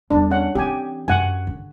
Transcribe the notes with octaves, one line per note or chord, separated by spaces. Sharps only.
E2 G3 D4
C#4 F#5
E3 C4 G4 G#5
F#2 F#5 G#5
D3